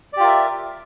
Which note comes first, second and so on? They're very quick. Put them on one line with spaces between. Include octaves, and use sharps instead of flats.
D5 G4 F4 A#4 E5